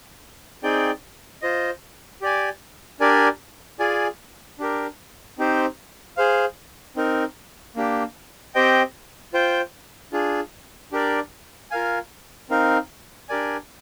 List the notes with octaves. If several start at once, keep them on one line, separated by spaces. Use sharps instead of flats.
C4 D#4 G#4 D5 G5
F4 C5 D#5
G4 D5 G#5
D4 G4 A#4 D5 G#5
F4 G#4 D5 G#5
D4 G4 A#4
C4 D#4 G4 C5
G#4 C5 F5
C4 D#4 A#4
A#3 D4 G4
C4 G4 C5 D#5 G5
F4 C5 G5
D4 F4 G#4
D4 G4 A#4 D5
F4 A#4 F5 G#5
C4 D#4 A#4 F5
D4 G4 A#4 D5 G#5